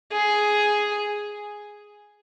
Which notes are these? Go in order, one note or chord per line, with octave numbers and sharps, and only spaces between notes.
G#4